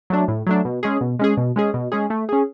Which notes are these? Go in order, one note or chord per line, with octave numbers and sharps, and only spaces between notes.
F#3 A3 D4
A2
F#3 A3 D4
B2
G#3 C#4 G#4
B2
G#3 C#4 G#4
B2
G#3 C#4 G#4
B2
G#3 C#4 G#4
A3
C#4 G#4